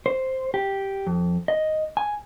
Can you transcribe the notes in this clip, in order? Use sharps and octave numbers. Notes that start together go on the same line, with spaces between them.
C5
G4
F2
D#5
G#5